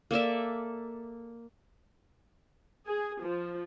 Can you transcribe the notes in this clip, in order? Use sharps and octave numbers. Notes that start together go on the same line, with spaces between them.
A#3 A4 D5 E5
G#4
F3